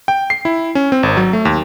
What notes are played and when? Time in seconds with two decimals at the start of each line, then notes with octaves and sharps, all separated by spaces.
0.08 G5
0.30 C7
0.45 E4
0.75 C#4
0.92 C4
1.03 G#1
1.17 F#3
1.33 A3
1.45 D#2